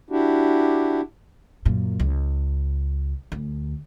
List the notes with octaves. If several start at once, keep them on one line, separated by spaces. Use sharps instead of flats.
D4 E4 F#4 G4
F#2 A#2
C#2
D2